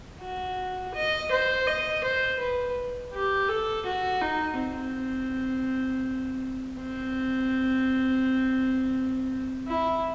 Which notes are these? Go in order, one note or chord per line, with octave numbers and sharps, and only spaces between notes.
F#4
D#5
C5
D#5
C5
B4
G4
A4
F#4
D#4
C4
C4
E4